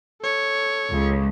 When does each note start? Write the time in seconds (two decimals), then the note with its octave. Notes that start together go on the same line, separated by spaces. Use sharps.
0.21 A4 C#5
0.91 C#2